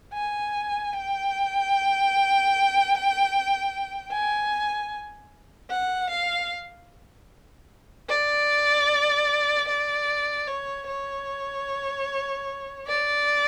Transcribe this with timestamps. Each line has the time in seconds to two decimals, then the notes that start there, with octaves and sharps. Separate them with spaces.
0.13 G#5
0.93 G5
4.11 G#5
5.70 F#5
6.10 F5
8.09 D5
9.68 D5
10.47 C#5
10.88 C#5
12.87 D5